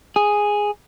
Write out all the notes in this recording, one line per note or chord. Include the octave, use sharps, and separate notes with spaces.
G#4